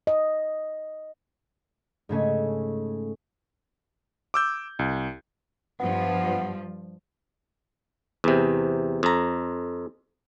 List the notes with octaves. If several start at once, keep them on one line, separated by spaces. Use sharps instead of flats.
D#5
G#2 C#3 A3 C#4
D6 E6 G6
C2
G2 F3 B3
E2 C3
F2 A#5